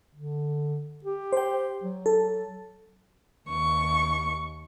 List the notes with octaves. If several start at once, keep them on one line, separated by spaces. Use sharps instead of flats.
D3
G4
C5 G5
F#3
A4
D#2 C#6